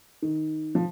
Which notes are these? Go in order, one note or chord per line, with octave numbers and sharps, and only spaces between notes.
D#3
F3